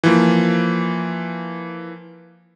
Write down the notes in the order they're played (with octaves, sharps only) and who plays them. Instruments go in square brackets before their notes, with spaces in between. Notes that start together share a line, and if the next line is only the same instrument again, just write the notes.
[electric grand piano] E3 F3 A#3